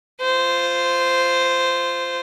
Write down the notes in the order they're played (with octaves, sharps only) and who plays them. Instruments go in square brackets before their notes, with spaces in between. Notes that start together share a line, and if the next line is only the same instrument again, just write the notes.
[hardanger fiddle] F4 C5